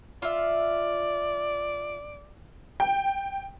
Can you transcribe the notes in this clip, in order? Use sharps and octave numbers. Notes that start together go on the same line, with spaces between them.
F4 D5 E5
G5